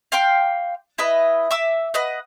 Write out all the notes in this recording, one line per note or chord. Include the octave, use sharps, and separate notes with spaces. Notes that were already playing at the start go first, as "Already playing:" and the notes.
F5 G5 C6 D6
E4 B4 D#5
E5 D6 E6
B4 D#5 F#5